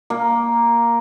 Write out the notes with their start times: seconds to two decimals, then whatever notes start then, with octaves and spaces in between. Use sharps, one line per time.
0.10 A#3